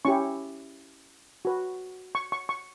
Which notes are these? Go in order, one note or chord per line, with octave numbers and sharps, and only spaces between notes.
C#4 E4 G4 C#6
F#4 B4
C#6
C#6
C#6